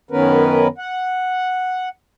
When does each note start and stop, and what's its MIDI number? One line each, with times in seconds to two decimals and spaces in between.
0.11 0.68 42
0.11 0.68 51
0.11 0.68 59
0.11 0.68 61
0.11 0.68 70
0.11 0.68 71
0.78 1.89 78